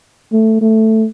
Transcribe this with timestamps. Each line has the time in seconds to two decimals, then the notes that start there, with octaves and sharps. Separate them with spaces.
0.32 A3
0.61 A3